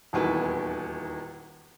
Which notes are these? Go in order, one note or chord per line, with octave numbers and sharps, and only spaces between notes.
D#1 E2 D#3 E4 F#4 B4